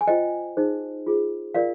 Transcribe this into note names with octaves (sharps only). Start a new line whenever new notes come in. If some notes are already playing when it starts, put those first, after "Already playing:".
G#5
F4 C5 D#5 G5
D#4 G#4 C5
F4 G#4 C5
F4 A#4 D5 F5